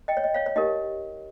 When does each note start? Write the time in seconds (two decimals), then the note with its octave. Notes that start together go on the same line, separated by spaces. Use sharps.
0.08 D#5 G5
0.17 C#5
0.24 D#5
0.34 C#5 F5
0.46 C#5
0.56 D#4 G4 A#4 D#5